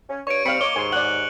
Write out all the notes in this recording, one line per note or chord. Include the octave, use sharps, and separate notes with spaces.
C#4
G2 C#5 C#6 D7
D#2 G3 C4 F5 B5 C#7 F7
A#3 C#5 D#5 D6 G7
D#2 G#2 G#5 C6
D5 F#5 F#6 F#7